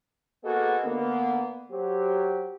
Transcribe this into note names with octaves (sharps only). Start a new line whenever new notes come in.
A#3 B3 F#4 G#4 A4 D#5
D3 A#3 B3
F#3 G4 C5